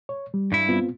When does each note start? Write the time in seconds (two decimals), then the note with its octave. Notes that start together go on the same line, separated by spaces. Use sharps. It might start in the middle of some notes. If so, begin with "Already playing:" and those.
0.09 C#5
0.34 G3
0.52 G2 E4
0.69 B3 C4 F4